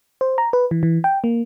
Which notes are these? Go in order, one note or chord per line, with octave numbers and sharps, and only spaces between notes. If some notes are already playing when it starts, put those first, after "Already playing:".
C5
A#5
B4
E3
E3
G5
A#3